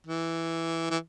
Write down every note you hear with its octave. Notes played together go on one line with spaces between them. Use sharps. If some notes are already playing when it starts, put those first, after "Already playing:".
E3
E3